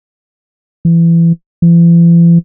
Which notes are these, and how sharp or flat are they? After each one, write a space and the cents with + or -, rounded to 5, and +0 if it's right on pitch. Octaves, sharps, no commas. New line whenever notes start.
E3 +25
E3 +45